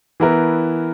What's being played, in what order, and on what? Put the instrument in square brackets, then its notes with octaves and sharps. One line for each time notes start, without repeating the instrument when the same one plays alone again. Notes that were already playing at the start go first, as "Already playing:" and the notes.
[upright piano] E3 B3 E4 A#4